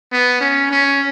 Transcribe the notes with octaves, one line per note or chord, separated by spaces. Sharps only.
B3
C#4
C#4